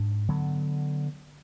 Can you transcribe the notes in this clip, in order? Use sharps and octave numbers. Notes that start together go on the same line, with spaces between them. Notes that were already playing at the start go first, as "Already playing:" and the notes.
Already playing: G#2 D4
D3 F#3 B3